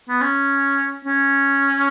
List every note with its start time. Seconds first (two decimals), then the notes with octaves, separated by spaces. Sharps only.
0.09 B3
0.21 C#4
1.05 C#4